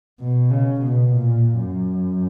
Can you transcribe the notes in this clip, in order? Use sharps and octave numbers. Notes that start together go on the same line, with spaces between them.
B2
C#3
B2
A#2
F#2